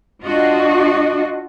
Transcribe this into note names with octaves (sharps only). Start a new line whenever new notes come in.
D4 F4 F#4 D#5